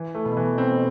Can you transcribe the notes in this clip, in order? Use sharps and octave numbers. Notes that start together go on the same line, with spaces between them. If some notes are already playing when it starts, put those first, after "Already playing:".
Already playing: E3
A3
B2
E3
C4